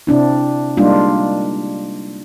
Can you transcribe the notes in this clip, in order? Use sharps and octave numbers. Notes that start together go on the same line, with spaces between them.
C3 C4 D4 E4
G3 G#3 A#3 D4 D#4 F4